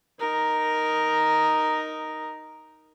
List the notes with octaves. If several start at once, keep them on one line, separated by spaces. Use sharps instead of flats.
D#4 A#4